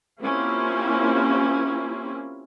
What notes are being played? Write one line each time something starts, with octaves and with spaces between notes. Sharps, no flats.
A#3 C4 C#4 E4 F4 G4